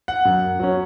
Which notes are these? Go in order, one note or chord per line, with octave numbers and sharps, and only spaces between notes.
F#5
F#2
F#3 C#4